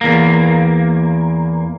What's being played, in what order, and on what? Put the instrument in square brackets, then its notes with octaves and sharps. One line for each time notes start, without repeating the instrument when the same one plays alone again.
[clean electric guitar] E2 A#3